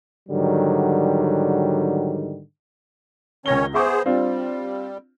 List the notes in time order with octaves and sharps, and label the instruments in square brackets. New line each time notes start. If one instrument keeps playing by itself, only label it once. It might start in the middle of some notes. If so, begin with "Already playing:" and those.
[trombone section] G#2 D3 D#3 F#3 G3
[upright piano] C#2 A#6 G7 [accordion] D#3 C#4 C#5
[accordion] B3 G#4 C5 [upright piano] E5 C#6 D6
[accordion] G3 [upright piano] C4 D4 F4